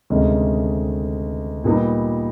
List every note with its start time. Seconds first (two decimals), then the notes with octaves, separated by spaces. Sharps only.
0.10 D2 C3 D#3 G#3 C#4
1.64 A#2 G3 B3 D#4